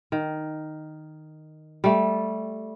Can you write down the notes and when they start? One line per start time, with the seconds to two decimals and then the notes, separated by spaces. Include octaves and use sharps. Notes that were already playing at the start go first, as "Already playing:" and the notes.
0.12 D#3
1.84 G3 A3